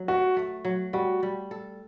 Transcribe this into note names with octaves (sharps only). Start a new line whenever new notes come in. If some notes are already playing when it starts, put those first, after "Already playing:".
Already playing: F#3
A3 F#4
A3
F#3
G3 F#4
G3
A4